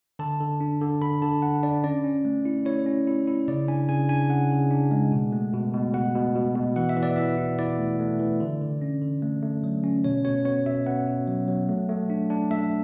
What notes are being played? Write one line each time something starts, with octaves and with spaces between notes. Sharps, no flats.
D3 A5
D3
D4
D3
D3 B5
D3 A5
D3 F#5
D4 D5
C#4 D5
C#4
A3
E4
E4 C#5
C#4
E4
E4
C#3 D5
D4 G#5
C#3 G#5
D4 G#5
C#3 F#5
C#3
D4
G#3
B2
A3
B2
B2
B2 F#5
B2
B2
B2
E3 F#5
E5
E3
D5
E3 E5
E4
E4 D5
A3
A3
E3
D3
D3
C#4
D3
A3
A3
F#3
C#4
B2 C#5
B2 C#5
B3 C#5
B2 E5
B3 F#5
B2
F#3
F#3
A3
A3
D4
D4
A3 E5